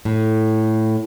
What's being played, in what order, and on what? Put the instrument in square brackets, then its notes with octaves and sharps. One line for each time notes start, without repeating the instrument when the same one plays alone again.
[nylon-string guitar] A2